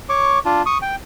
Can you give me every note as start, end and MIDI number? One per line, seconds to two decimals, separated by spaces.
0.09 0.39 73
0.09 0.39 85
0.09 0.39 86
0.45 0.62 62
0.45 0.62 65
0.66 0.78 85
0.66 0.78 87
0.82 0.96 79